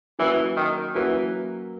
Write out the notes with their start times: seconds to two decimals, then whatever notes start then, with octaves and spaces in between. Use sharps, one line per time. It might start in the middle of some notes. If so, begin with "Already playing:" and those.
0.19 E3 F#3 A#3 C#4 F#4 B4
0.57 D#3
0.95 E3 F#3 A#3 C#4 F#4 B4